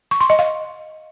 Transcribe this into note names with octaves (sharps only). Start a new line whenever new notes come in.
C#6
C6
D#5
F5